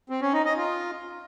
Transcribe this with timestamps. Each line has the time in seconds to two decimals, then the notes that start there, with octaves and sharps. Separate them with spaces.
0.09 C4
0.21 C#4
0.33 D#4
0.45 D#5
0.57 F4